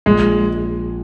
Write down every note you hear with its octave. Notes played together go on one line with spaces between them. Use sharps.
A#1 G#3